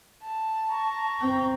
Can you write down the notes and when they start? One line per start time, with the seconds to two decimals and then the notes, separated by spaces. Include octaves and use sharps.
0.23 A5
0.69 A#5 C#6
1.21 C4 G5